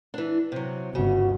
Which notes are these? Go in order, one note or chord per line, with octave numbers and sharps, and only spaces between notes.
E3 D4
C3 F#3
G1 C#3 F#4